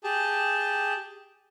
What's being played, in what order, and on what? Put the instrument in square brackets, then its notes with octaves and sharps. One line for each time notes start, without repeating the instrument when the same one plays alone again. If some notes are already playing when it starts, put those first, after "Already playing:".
[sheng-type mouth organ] G4 G#4 A5